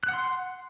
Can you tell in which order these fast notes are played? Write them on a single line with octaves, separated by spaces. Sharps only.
F#6 F#5 C6